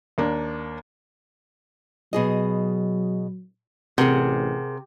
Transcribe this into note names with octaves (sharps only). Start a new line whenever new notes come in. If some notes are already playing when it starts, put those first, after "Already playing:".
D#2 A#3 D4
B2 F#3 G#4 D#5
A1 C3 G#4 A#4 F#5